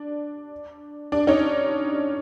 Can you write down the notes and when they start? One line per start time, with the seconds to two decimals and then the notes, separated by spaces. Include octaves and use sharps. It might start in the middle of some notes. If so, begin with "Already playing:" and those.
Already playing: D4
1.12 D4
1.27 C#4 D#4